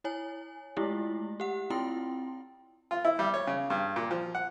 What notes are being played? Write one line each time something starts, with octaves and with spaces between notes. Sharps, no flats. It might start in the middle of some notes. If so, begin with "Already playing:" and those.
E4 C#5 G#5
G#3 A3 E4 F4 G4
G4 F#5
C4 E4 F4 G5 C6
F4
E4
G3
C#5
C#3
G2
A#2
F3
F#5